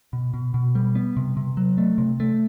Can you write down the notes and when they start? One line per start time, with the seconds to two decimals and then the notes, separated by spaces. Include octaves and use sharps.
0.13 B2
0.34 B2
0.54 B2
0.75 G3
0.95 B3
1.17 C3
1.37 C3
1.57 F#3
1.78 A3
1.98 C3
2.20 A3